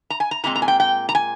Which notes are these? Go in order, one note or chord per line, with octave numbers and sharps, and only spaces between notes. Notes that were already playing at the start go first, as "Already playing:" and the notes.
A#5
G#5
A#5
A#2 G#3 C4 A#5
A#5
G#5
G5
G5
A#5
G#5